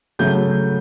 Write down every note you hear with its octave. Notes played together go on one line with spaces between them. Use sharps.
C#3 F#3 A3 G6